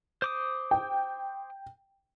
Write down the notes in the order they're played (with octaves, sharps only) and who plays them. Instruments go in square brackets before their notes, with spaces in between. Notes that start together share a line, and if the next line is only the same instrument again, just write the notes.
[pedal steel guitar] C5 D6 D#6
[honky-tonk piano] G5